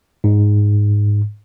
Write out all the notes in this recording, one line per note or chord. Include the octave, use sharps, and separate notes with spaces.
G#2